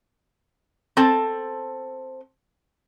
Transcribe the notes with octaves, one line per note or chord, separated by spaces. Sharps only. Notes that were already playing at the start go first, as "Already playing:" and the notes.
C4 A4 A5